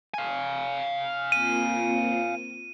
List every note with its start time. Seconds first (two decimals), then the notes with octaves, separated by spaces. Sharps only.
0.14 F5 G#5
1.32 A#3 C4 F4 D#7